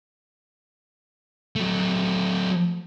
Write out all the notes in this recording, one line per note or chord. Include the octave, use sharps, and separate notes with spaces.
F#3 A3